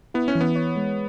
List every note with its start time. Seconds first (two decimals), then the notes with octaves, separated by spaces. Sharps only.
0.14 B3 E4
0.28 C#4
0.35 E3
0.41 B3
0.56 C#5
0.76 G#3